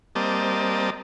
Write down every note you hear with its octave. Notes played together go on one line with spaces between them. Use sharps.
G3 A#3 C4 D5 D#5 A5